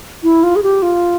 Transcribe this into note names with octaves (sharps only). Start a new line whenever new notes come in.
E4
F4
G#4
G4
F4